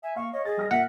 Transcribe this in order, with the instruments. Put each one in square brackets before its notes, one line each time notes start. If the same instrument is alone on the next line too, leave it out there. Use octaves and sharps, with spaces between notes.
[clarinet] E5 [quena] G#5
[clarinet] A#3 [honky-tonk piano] F5 [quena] C#6
[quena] C#5 [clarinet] D#5
[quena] G#4 [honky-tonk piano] A6
[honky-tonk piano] G3 F6 A#6
[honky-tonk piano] A#2 [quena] E5 [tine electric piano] F#5